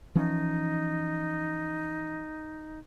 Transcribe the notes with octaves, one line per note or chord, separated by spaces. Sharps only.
E3 F3 C#4 D#4